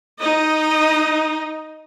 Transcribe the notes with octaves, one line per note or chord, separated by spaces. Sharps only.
D#4 D#5